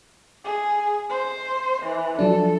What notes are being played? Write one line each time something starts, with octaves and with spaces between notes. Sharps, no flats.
G#4
C5
E3
F3 F#3 D4 A4